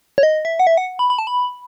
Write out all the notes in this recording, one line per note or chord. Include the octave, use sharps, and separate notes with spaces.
C#5
D#5
E5
F#5
E5
F#5
B5
B5
A5
B5